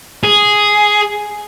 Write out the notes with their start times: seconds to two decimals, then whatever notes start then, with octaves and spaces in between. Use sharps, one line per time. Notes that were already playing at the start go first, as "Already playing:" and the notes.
0.24 G#4